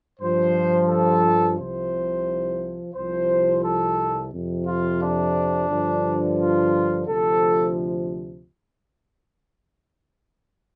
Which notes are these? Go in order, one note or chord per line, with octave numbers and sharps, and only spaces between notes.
G2 F3 C5
A4
C2 C3 F3 C5
C2 C3 F3 C5
A4
F2 C3 F3
F4
D4
G2 D3 F3
F4
D2 C3 F3 A4